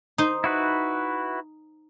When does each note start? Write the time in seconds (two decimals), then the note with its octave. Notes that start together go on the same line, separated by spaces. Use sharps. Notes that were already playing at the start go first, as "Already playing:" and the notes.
0.18 D#4 C5
0.44 E4 F#4 B4